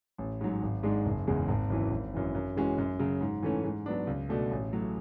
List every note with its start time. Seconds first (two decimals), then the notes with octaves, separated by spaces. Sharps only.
0.18 A1
0.41 G#2 F#3
0.62 G#1
0.83 G#2 G#3 D4
1.06 F#1
1.27 E2 C#3 G#3
1.48 G#1
1.70 F#2 E3
1.91 G#1
2.14 F#2 E3
2.35 F#2
2.56 E3 G#3 C#4 F#4
2.78 F#2
2.99 C#3 F#3
3.21 G#2
3.43 E3 A3 C#4
3.64 G#2
3.86 F#3 B3 D4
4.07 C#2
4.29 B2 A3 D4 F#4
4.51 A1
4.73 A2 F#3